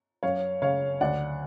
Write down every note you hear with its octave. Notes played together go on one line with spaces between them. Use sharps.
F#2 C#5 F5
C#3 C#5 F5
D2 D5 F#5